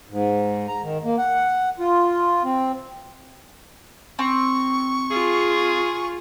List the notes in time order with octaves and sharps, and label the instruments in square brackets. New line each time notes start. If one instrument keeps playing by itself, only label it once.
[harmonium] G#2
A#5
D#3
A#3
F#5
F4
C4
[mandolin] C4 [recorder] C#6
[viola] F4 [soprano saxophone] G#4